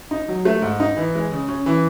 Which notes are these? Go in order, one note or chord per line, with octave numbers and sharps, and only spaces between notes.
D#4
F#3
A3
G#2
D#4
E3
G#3
C#3
C#4
E3